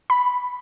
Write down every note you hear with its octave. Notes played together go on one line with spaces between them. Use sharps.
B5